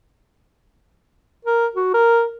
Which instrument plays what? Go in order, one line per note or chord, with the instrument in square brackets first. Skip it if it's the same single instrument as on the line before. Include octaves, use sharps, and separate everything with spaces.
[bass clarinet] A#4
F#4
A#4